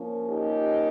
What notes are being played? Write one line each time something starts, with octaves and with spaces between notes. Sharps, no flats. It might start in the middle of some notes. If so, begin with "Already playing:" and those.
Already playing: F3 A#3 C#4
D#4 G4